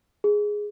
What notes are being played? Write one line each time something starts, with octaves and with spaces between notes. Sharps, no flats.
G#4